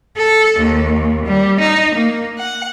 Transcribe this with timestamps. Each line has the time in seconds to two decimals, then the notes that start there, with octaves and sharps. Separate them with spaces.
0.17 A4
0.58 D#2
1.25 G3
1.58 D#4
1.95 A#3
2.37 F#5